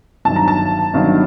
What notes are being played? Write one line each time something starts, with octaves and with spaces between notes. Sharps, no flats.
G1 G2 D#3 F#3 A5
A#5
A5
G1 G2 D#3 F#3